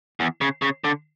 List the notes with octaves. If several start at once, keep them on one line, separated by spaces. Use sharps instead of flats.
E2
C#3
C#3
D3